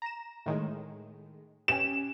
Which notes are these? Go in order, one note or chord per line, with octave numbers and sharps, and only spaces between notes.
A#5 E7
A2 D#3 G#3
C#4 G4 E7